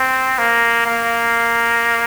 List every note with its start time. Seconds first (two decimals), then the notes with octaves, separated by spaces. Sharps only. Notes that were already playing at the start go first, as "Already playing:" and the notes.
Already playing: C4
0.39 A#3
0.86 A#3